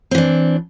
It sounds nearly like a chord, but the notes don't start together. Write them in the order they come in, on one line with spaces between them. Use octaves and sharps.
C4 E3 D4